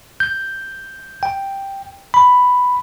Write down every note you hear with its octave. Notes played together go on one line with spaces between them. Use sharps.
G6
G5
B5